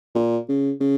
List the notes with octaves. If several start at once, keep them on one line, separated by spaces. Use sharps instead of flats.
A#2
C#3
C#3